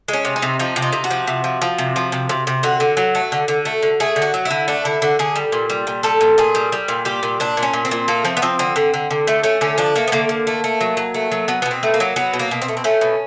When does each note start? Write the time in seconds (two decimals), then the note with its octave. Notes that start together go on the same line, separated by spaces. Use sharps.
0.08 G#3
0.13 C#4
0.25 C3
0.36 D#4
0.42 C3
0.59 F3 D#4
0.76 C3
0.82 D#4
0.93 C3
1.04 F#4
1.11 F3
1.27 C3
1.44 F3
1.61 F3
1.78 C3
1.96 F3
2.12 C3
2.29 C3
2.47 C3
2.63 D3 F#4
2.80 D3
2.97 F#3
3.15 A3
3.32 D3
3.48 D3
3.65 A3
3.83 D3
4.00 A3 G#4
4.16 D3
4.22 F#4
4.34 F#3
4.45 E4
4.50 D3
4.68 A3 D4
4.85 D3 E4
5.02 D3 F#4
5.19 D3 G#4
5.35 G3
5.52 A#2
5.70 G3
5.87 A#2
6.03 G3 A4
6.21 A#2
6.38 A#2 G#4
6.55 G3
6.72 G3
6.88 A#2
7.05 G3 G4
7.23 A#2
7.40 A#2 D4
7.57 A#2
7.63 C#4
7.73 A#2
7.85 C4
7.91 A#2
8.08 A3 A#3
8.25 F3 C4
8.37 B3
8.42 F3 C4
8.59 D3 C4
8.76 D3
8.94 D3
9.11 D3
9.27 A3
9.44 A3 C#4
9.61 D3 C#4
9.78 F3 D4
9.96 A3 A#3
10.08 B3
10.12 D3 A#3
10.29 D3
10.47 A3
10.64 A3
10.81 F#3
10.97 F#3
11.14 A3
11.32 F#3
11.48 F#3 B3
11.62 B2 B3
11.71 C4
11.83 A3
11.94 A#3
12.00 F#3
12.16 F#3 B3
12.33 B2
12.39 A#3
12.51 B2
12.62 C4
12.68 A3
12.77 C4
12.84 A3 C#4
13.01 B2